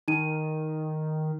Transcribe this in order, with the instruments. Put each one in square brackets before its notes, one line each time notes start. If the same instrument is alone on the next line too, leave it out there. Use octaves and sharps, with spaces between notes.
[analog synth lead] D#3 [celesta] D#4 D#7